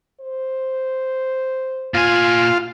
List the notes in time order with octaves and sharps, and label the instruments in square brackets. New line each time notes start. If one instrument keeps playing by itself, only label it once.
[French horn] C5
[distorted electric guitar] A#2 G#5 [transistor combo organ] F4